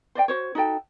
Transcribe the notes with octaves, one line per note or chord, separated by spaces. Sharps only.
C5 D5 D#5 G5
F#4 C5 C#5
D#4 F#4 A4 G5